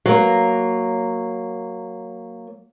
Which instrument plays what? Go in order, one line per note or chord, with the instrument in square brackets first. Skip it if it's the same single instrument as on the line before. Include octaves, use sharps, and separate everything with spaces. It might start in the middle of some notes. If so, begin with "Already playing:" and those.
[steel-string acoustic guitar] F#3 A#3